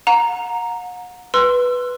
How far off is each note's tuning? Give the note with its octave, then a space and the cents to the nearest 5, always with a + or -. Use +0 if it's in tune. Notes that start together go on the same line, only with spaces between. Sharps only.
F#5 -40 A#5 +0
B4 +0 C6 +0 E6 +30